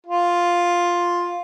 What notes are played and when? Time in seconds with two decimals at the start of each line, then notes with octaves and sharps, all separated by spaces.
0.07 F4